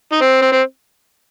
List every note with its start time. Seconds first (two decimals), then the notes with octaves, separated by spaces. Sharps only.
0.12 D#4
0.21 C4
0.41 C4
0.52 C4